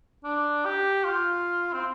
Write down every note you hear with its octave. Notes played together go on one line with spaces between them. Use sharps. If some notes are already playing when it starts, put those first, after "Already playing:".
D4
G4
F4
C4